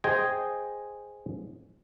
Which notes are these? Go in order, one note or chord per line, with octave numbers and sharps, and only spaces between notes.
G#4 C5 D#5 G5 G#5